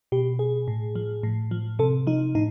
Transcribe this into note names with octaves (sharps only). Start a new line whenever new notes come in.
B2 G4
G#4
A2
F3
A2
F3
C3 A4
F3 D#4
A2 D#4